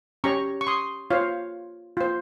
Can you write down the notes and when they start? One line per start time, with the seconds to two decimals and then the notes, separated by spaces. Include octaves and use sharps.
0.24 C#4 G4 C#5 A#5 C#6
0.61 C#6
0.67 C6 D#6
1.10 F4 C5 C#5 F5
1.97 F4 C5